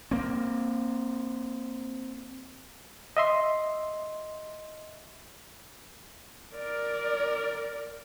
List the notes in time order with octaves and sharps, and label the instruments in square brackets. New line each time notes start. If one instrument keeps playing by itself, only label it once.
[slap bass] A#3 C4
[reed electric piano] D#5 E5 C6
[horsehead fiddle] A#4 D5